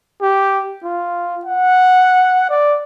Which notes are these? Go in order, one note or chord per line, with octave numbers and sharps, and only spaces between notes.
G4
F4
F#5
D5